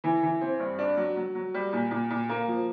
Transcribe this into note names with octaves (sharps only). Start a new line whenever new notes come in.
E3
E3
C4
G2
D4
F#3
F#3
F#3
G3
A#2
A#2
A#2
A#3
F3